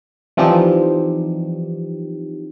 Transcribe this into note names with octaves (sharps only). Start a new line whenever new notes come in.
E3 F3 G3 C4 D#4 G4